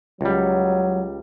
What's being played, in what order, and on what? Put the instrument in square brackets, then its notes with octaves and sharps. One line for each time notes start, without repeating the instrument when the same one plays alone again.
[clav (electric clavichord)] C#2 G3 [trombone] F#3